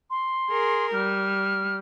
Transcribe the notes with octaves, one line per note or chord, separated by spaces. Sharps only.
C6
G#4 A#4
G3 F6